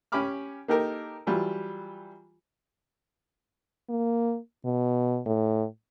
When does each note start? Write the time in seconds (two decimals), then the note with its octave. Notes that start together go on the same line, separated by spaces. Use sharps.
0.12 C#4 G4 G#5 B5 D6 F6
0.68 A#3 D#4 G4 A4 A#4
1.27 E3 F#3 G3 F4
3.89 A#3
4.65 B2
5.26 A2